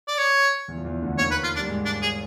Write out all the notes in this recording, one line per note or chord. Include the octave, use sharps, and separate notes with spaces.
D5
C#5
E2 E3
F3
E2 E3
D2 D3
D#2 D#3 C#5
B4
F4
G3 D4
G#2 G#3
D4
G#4